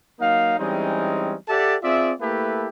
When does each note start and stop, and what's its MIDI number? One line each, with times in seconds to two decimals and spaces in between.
0.20 0.59 54
0.20 0.59 58
0.20 0.59 63
0.20 0.59 77
0.59 1.34 52
0.59 1.34 55
0.59 1.34 56
0.59 1.34 60
0.59 1.34 61
0.59 1.34 63
1.49 1.75 67
1.49 1.75 69
1.49 1.75 74
1.49 1.75 76
1.49 1.75 78
1.49 1.75 81
1.83 2.11 60
1.83 2.11 65
1.83 2.11 68
1.83 2.11 74
1.83 2.11 76
2.20 2.67 57
2.20 2.67 58
2.20 2.67 64
2.20 2.67 67
2.20 2.67 69
2.20 2.67 71